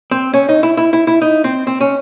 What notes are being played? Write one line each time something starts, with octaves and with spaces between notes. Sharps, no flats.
C4
C#4
D#4
E4
E4
E4
E4
D#4
C4
C4
C#4